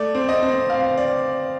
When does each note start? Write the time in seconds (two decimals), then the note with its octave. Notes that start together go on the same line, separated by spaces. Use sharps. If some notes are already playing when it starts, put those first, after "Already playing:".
Already playing: A3 D5
0.15 C4
0.29 D#5
0.42 C4
0.70 C4 F5
0.98 D5